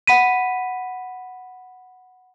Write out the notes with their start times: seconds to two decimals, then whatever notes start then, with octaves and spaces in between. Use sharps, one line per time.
0.07 F#5 B5 B6 D#7